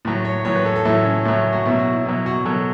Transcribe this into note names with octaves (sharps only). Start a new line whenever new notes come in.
A2 F#3
C#5
A2 F#3 C#5
B4
A4
A4
A2 F#3 E4
C#4
A2 F#3 E4
F#4
B2 F#3 E4
F#4
E4
B2 F#3 E4
F#4
B2 F#3 A4